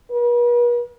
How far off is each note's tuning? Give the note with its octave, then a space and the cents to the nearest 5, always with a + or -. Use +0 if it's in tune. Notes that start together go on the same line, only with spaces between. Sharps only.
B4 -45